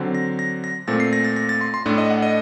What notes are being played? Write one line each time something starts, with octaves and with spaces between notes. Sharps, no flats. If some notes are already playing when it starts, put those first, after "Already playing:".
Already playing: D3 F#3 C4
A#6
A#6
A#6
A#2 A3 C4 A6
C7
A#6
A6
A#6
A6
C6
C6
A2 A3 D4
D#5
F#5
D#5